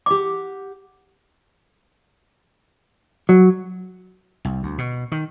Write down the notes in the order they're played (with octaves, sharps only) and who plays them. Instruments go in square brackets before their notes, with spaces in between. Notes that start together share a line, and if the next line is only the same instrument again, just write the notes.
[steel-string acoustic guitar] G4 F#5 [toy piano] D6
[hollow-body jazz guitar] F#3
[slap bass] C2
D2
B2
D#3